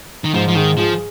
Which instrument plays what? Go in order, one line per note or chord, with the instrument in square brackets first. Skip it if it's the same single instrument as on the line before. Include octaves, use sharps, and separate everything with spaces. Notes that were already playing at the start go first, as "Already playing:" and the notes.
[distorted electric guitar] D#3
[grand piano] G#2 [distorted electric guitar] F3
[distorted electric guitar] F3
[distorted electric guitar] D#3 [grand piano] G#4
[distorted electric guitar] F3 [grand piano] G#4